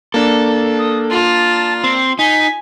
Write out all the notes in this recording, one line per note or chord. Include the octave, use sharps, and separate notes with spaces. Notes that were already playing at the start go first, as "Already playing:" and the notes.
A#3 D4 A4
D#6
F4 A5
C4 C7
D#4 G#5 B6